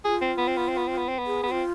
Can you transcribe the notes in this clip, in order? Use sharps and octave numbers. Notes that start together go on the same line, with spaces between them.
F4 G#4
C4
B3
C4
B3
C4
B3
C4
B3
C4
B3
G#4
B3
C4 F4